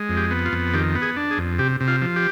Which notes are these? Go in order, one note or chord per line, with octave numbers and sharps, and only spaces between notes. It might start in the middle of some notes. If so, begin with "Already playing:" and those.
Already playing: G#3
F2
G4
B3
F4
F2
D#3 G4
B3
G#4
D4
G#4
F2
C3 G4
C3
F4
F3
G4